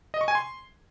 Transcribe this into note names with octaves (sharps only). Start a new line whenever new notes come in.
D#5
C#6
G#5
C6